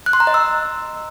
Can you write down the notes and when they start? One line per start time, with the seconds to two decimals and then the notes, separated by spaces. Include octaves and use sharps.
0.06 F#6
0.13 C6
0.20 A#5
0.27 D#5
0.34 E6